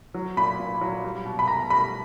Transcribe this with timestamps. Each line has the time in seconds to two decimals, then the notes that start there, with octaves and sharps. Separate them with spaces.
0.14 F#3
0.37 A#2 B5
0.59 A#2
0.81 F#3
1.04 G3
1.26 B2
1.39 B5
1.48 B2 A#5
1.70 G3 B5